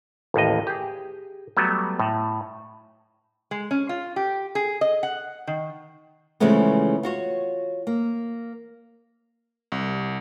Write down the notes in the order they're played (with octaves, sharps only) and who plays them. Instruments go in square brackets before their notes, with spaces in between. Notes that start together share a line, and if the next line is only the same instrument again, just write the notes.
[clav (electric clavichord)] A1 D#2 A2 D#5
G4 G#4
F#3 G3 A3 B3
A2
[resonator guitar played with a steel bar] G#3
C#4
F4
G4
G#4
D#5
F#5
D#3
[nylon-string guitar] C#3 E3 F3 G#3 A3 B3
F4 F#4 C#5
A#3
[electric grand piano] C2